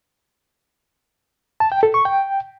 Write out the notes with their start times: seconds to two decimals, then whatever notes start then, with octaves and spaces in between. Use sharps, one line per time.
1.60 A5
1.72 G5
1.83 A4
1.94 C#6
2.05 G5